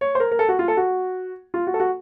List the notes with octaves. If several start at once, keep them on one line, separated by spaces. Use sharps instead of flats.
C#5
C5
A#4
A#4
A4
F#4
F4
A4
F#4
F4
F#4
A4
F#4